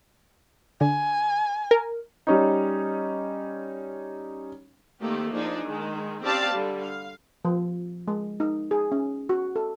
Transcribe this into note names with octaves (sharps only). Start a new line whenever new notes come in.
D3 G#5
A#4
G3 C#4 D#4
D#3 A3 A#3 C4 G4 A4
F3 D4 D#4 G#4
D#3 G#3
C4 C#4 G4 D5 F5 A5
D3 G3
F5
F3
G#3
D#4
G#4
C#4
F#4
A4